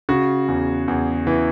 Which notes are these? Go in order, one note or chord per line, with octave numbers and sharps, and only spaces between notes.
C#3 F#4
E2
E2
E3